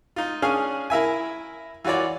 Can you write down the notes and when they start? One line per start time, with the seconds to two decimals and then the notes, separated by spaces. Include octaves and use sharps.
0.16 D#4 F4
0.42 C#4 D4 G#4 F5 G#5
0.90 E4 A#4 E5 G#5
1.85 E3 F4 F#4 C#5 D5